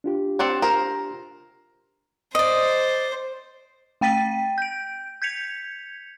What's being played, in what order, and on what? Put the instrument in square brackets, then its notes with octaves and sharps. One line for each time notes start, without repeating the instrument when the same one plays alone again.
[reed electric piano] D4 F4 G4
[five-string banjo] C4 D5 F#5
A#4 C5
[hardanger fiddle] C5 [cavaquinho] D5 D#5
[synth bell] A3 G5 A6 B6 D#7
G6 D7
G6 G#6 B6 C#7 F7